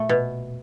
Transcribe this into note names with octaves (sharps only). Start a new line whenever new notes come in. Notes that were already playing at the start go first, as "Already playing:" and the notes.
Already playing: A#2 A3
B2